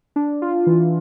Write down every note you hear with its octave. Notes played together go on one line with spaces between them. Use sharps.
D4
F4
E3